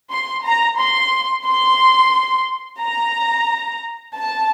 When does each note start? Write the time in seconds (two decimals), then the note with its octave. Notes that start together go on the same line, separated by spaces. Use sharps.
0.11 C6
0.44 A#5
0.78 C6
1.45 C6
2.81 A#5
4.15 A5